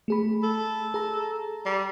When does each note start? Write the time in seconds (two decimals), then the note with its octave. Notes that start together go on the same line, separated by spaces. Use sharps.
0.08 A3 G#4 B5
0.43 A4
0.94 G#4 A#5
1.66 G3